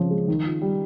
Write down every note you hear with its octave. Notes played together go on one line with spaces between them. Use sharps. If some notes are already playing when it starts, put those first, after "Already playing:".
Already playing: C#3 F3 G#3 C#4
G#3
D#3
F4
G3